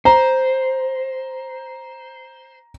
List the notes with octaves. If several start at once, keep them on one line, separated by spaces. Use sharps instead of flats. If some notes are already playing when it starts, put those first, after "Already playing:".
C5 A#5